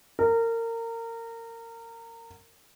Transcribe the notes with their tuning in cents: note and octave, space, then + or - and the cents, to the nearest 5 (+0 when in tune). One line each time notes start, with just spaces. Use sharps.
A#4 -25